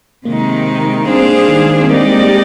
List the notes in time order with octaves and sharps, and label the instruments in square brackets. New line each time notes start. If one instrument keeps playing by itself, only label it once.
[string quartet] C3 D#3 G#3 D#4 [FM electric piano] A#3
[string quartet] G3 D4 G#4 C5 F5 [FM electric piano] C4
[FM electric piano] A#3
D#3
G#3
A#3
C4
[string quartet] G#3 D#4 G4 D5 [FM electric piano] A#3
[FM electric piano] C4
A#3
G3